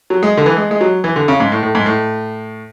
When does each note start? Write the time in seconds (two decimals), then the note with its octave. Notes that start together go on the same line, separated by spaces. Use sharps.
0.10 F#3
0.23 G#3
0.37 D3
0.46 E3
0.57 G#3
0.71 G#3
0.81 F#3
1.04 E3
1.16 D3
1.28 C#3
1.40 G#2
1.52 A2
1.63 A2
1.75 G#2
1.86 A2